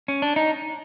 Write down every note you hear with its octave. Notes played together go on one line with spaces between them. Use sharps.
C#4
D4
D#4